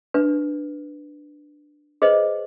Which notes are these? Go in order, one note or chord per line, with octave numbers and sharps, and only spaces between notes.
D4 B4
G#4 B4 C5 D#5